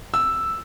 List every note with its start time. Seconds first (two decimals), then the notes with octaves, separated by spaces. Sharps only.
0.14 E6